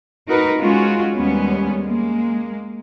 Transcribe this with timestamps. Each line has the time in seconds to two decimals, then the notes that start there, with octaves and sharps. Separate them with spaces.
0.28 D#4 F#4 A#4 B4
0.59 G#3 C#4 F4 F#4
1.15 D#2 G3 G#3 B3 C#4
1.85 G#3 A#3